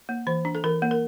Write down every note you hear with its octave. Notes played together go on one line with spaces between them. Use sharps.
A#3
E3 C5
D4
A4
E3 A#4
A#3
A#4